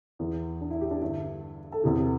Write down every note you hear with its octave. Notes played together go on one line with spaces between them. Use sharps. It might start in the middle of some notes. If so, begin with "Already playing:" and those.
E2 E3
D4
E4
G4
D4
G2 D3 E4
A4
E2 C3 E3 G4